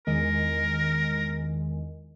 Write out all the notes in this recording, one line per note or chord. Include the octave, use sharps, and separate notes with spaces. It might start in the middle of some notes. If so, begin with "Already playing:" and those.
E2 D#3 G#3 A#4